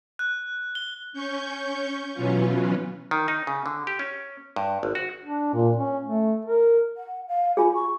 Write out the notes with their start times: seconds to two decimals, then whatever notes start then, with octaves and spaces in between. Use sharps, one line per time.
0.19 F#6
0.75 G7
1.13 C#4 C#6 G6
2.13 B2 E3 F#3 B3 C#4 F4
3.11 D#3
3.28 D#4
3.47 C#3
3.66 D3
3.87 G4
3.99 C#4
4.56 G2
4.83 G#1
4.95 F#4
5.25 D4
5.54 A#2
5.77 C#4
6.05 A3
6.45 A#4
6.96 F#5
7.28 F5
7.57 F4 G#4 G#5
7.74 C#6